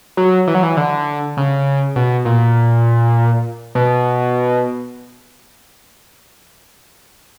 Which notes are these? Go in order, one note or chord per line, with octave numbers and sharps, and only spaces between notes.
F#3
E3
F#3
E3
D3
C#3
B2
A#2
B2